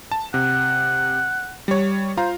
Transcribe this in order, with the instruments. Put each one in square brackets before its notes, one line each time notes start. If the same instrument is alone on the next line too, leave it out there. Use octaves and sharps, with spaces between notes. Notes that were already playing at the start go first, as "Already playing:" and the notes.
[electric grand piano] A5
[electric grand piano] C3 [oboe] F#5
[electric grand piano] G3 C#5
[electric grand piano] F4 F5 A#5 [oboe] C5